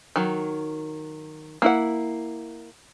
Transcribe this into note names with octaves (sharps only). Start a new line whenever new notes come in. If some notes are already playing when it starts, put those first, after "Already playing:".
D#3 F#3
A#3 E4 F#5